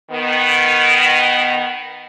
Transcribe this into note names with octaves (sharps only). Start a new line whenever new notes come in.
D#3 B3